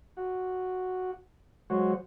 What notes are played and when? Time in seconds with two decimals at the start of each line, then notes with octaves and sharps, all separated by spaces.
0.17 F#4
1.70 F#3 G#3 F#4 C5 C#5